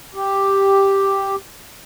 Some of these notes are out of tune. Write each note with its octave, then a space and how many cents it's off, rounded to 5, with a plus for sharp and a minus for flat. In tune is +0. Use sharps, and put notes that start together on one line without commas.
G4 +0